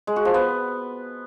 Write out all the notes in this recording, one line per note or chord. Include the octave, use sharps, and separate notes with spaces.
G#3
F#4
F3
B3